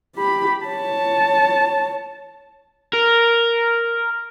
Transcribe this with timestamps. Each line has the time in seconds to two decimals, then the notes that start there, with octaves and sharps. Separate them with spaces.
0.16 G4 B5
0.66 C#5 A5
2.93 A#4